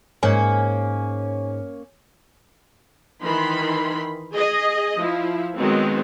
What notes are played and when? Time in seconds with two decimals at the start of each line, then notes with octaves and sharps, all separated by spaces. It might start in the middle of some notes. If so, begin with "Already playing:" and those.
0.23 G#2 A#3 C#4 C#5 G#5
3.22 D#3 E3 B5 C6
4.34 G#4 D#5
4.97 F3 E4
5.55 D#3 F#3 G#3 B3 C4